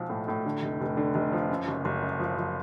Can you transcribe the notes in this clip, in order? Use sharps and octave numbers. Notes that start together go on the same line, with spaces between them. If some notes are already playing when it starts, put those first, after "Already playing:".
Already playing: B1 F3
A2
A2
D3
F1
F1
D3
F1
F3
F#2
F#1
F#1
F#2
F3
F3